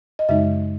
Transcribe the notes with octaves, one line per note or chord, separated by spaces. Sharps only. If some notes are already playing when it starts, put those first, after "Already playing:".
D#5
F#2 C#3 G#3 D#4 E5